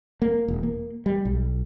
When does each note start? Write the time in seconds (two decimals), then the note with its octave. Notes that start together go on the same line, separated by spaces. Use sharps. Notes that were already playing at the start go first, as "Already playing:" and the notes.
0.22 A#3
0.48 E1
0.63 A#3
1.06 G3
1.25 B1